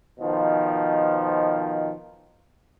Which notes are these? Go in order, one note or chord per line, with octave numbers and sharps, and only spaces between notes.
B2 D#3 F3